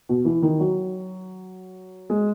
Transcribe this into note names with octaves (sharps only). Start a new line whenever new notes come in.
B2
E3
D#3
F#3
G#3